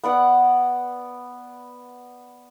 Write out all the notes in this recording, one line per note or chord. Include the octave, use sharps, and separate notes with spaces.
B3 D5 F#5